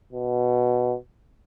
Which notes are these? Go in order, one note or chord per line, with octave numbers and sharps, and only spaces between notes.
B2